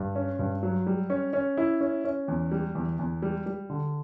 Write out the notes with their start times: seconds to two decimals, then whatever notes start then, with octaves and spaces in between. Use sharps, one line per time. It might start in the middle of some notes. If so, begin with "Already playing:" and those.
Already playing: G2
0.15 C#4
0.39 G2
0.63 F#3
0.87 G3
1.10 C#4
1.33 C#4
1.57 E4
1.81 C#4
2.04 C#4
2.28 E2
2.52 G3
2.75 E2
2.99 E2
3.23 G3
3.46 G3
3.70 D3